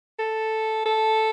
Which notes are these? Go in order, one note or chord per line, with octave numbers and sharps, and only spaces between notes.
A4
A4